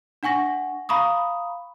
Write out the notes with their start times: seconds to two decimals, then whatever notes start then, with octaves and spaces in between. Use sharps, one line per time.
0.23 D4 F#5 G#5 C#6 A#6
0.89 F5 A#5 B5 C#6 D#6